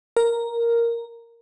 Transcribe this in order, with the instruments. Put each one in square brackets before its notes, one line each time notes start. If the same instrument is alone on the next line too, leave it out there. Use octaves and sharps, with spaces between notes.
[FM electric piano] A#4